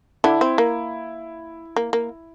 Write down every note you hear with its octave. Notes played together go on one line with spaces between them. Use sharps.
D3 D4 E4
C4
A#3
A#3
A#3